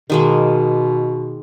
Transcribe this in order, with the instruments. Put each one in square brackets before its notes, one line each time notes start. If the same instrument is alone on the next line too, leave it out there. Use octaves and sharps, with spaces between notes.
[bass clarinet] B2 [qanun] D#3 G#3 A#3